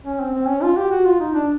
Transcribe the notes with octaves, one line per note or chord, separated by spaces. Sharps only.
C#4
C4
C4
C#4
F4
G4
F#4
F4
D#4
D4